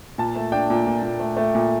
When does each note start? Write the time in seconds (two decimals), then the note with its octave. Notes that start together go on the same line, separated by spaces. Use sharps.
0.18 A#2 A5
0.36 A3
0.52 D4 G5
0.70 A#2
0.87 A#2
1.03 A#2
1.20 A3
1.37 A3
1.55 A#2